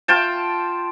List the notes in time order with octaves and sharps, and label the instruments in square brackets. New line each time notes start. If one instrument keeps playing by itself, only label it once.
[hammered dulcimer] F4 G5 A5